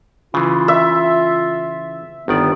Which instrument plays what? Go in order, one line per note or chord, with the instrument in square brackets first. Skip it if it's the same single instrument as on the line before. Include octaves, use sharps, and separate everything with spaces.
[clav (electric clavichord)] C#3 E3 [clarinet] F4
[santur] E5
[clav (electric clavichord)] G1 D#3 D5 [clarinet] B3